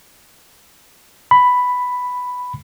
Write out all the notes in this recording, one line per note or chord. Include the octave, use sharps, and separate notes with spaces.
B5